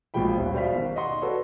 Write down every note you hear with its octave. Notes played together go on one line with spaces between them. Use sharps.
A#1 G#2 B2 F3 G5 B5
D#1
B2 C5 D5 F5 B6
D#3
D#5 F#5 C6 C#6
F#4 A4 B4 C#5 D5